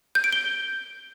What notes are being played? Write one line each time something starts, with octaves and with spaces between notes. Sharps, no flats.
G6
D7
G7